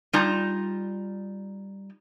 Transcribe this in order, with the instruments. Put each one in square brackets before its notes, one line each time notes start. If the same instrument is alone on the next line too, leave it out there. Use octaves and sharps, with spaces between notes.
[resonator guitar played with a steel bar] G3 D#4 F4 A5 A#5